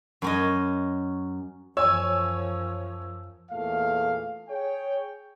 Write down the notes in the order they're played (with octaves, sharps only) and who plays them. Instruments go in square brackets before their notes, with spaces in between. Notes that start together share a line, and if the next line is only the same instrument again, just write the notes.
[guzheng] F#2 C#4 D#5
[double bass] F#2 F3 [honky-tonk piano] C#5 G#5 [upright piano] E6
[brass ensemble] E2 A#2 A3 F5
G#4 C#5 G5